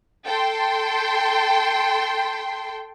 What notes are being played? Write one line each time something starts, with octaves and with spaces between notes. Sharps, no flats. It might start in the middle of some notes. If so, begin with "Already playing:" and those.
A4 G5 C6